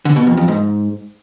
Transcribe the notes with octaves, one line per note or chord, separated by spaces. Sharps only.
D3
B2
F2
F2
G#2